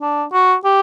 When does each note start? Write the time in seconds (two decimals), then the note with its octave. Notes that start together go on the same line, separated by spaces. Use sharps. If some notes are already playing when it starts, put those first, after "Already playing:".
0.01 D4
0.33 F#4
0.65 G4